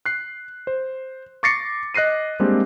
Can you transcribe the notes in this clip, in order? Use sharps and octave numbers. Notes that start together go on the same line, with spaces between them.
F#6 C7
C5
C#6 D6 A6 A#6 C7 C#7
D#5 F#6 A#6 C7 D#7
G3 G#3 A#3 C4 D4 G4